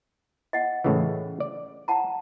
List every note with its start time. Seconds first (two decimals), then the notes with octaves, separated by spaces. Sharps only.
0.53 D#5 F#5
0.84 A2 C#3 E3
1.40 D5
1.88 F#5 A5 A#5